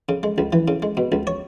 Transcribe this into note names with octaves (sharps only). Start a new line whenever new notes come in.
C#3
G#3
C#2
E3
C#3
G#3
B2
C#2
C#5